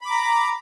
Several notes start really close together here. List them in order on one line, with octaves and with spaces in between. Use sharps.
B5 D6 A#5